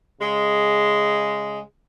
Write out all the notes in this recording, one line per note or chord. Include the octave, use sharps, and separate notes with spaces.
C#3 G#3